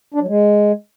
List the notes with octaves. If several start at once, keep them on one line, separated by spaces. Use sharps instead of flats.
D4
F#3
G#3